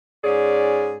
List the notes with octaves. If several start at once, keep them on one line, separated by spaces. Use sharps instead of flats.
G#2 C#4 G#4 D5